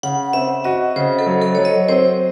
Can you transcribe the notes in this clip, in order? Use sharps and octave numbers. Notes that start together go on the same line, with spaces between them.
C#3 F#5
C4 E5
F#4 D#5
C#3 C5
A4
F#3
A4
F#3 C#5
D#5
C4 C5